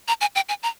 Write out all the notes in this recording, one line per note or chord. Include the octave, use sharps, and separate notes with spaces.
A#5
G#5
G5
G#5
A#5